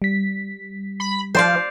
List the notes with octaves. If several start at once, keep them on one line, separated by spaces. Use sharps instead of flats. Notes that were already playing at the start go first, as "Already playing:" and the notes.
G3 B6
B5
F3 C5 D5 F5